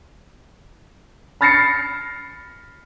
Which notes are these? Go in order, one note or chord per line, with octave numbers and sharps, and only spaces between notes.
B5 F6 A6 A#6 C7 C#7